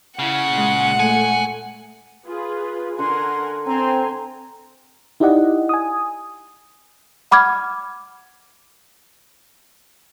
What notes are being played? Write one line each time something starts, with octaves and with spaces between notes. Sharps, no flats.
C#3 E4 F#5
A#2 G#3
A3 G#5
F4 G#4 B4
D3 A#4 F#5 G#5 C6
C4 G#5 A#5 C6
D#4 E4 G4 D5 D#5 F#5
G#5 D#6
F#5 B5 D6 F6 G#6